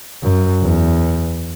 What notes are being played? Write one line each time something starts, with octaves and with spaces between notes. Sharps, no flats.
F#2
E2